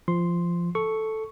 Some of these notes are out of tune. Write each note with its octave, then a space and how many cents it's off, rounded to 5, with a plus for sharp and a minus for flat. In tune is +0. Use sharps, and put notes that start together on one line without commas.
F3 -15 C6 +0
A4 -5 C#6 +0